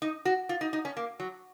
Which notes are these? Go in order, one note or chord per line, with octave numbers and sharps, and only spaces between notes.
D#4
F#4
F4
D#4
D#4
C#4
A#3
F#3